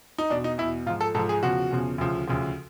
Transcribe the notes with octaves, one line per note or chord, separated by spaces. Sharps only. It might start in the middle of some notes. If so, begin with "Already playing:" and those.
D#4
E2 B2 D4
D#4
E2 B2 E4
G#2 F3 F4
A4
G#2 F3 A4
G#4
E2 C#3 F3 F#4
E2 C#3 F3
D2 C#3 F3
D2 C#3 F3